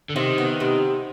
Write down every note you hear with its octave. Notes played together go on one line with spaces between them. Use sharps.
D3
C3 D#3
B3
C3